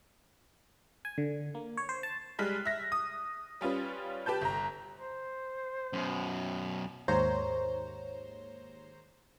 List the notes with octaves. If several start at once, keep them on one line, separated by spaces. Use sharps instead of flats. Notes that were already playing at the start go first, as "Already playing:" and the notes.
G#5
D3
A#3
C#5
C5
A5
G3 G#3 F6 F#6 B6
E5 A#6
D#6
G3 C#4 F4 B4
G4 B4 A5 G6
G1 A#5
C5
F#2 B2
D#2 G#2 C5 C#5 A#5 G6